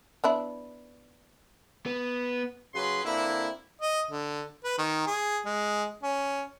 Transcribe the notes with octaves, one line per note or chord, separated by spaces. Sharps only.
B3 D4 E4
B3
C#3 F#3 F#4 G#4 B4 C6
D3 A#3 C4 E4
D#5
D3
B4
D#3
G#4
G#3
C#4